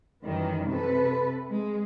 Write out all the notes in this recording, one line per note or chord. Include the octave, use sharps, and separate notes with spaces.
F#2 D#3 E3 G3
C3 A4 B4
G#3